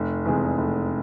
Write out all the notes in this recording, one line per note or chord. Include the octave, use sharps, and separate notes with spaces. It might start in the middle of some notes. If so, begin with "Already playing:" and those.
Already playing: F1
E2 C3 E3 G#3
F1